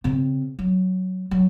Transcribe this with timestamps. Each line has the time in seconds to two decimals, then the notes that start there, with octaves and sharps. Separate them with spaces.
0.04 C#3 C4
0.59 F#3
1.31 F#3